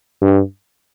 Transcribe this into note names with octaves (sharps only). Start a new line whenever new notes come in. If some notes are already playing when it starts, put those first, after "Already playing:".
G2